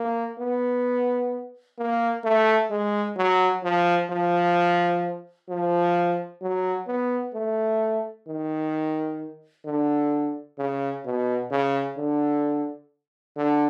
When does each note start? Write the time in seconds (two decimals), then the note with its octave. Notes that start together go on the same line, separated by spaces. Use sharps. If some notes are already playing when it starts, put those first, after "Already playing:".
Already playing: A#3
0.39 B3
1.78 A#3
2.24 A3
2.71 G#3
3.17 F#3
3.64 F3
4.11 F3
5.49 F3
6.42 F#3
6.87 B3
7.34 A3
8.28 D#3
9.65 D3
10.58 C#3
11.05 B2
11.51 C#3
11.98 D3
13.37 D3